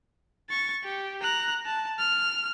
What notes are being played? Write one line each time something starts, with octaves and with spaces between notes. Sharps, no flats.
C#6 A6
G4
A#5 F#6
A5
F6